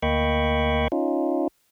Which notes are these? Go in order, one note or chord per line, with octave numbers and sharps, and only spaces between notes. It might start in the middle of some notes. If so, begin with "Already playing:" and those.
D2 A#3 D#5 G5 B5 C#6
C#4 D#4 F4